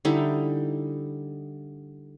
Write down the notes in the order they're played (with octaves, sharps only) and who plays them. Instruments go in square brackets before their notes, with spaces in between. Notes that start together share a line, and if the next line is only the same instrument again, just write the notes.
[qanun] D3 G3 D#4 E4